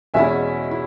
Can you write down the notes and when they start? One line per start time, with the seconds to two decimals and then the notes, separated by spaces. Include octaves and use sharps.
0.14 E2 B2 G#3 C#4 E4 E5 G#5
0.71 E4